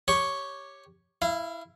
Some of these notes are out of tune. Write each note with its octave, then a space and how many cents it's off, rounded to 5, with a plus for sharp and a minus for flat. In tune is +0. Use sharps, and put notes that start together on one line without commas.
G4 +0 C#5 +0 C#6 +0
E4 +0 F5 -30